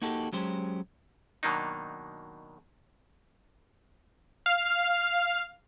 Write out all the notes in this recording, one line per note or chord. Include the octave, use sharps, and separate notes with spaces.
A#3 D#4 F#4 G4 A4
F#3 G#3 C#4 G4 C5
B2 D#3 F#3 A#3 D4 D#4
F5